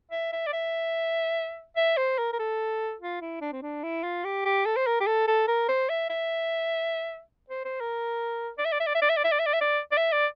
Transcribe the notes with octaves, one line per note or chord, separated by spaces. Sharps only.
E5
E5
D5
E5
E5
C5
A#4
A#4
A4
F4
E4
D4
C4
D4
E4
F4
G4
G4
A4
C5
A#4
G4
A4
A4
A#4
C5
E5
E5
C5
C5
A#4
D5
E5
D5
E5
D5
E5
D5
E5
D5
E5
D5
E5
D5
E5
D5
D5
E5
D5